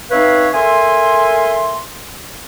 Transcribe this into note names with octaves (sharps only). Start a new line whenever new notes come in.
C4 D#4 B4 C#5 E5 F5
A4 A#4 E5 G#5 C6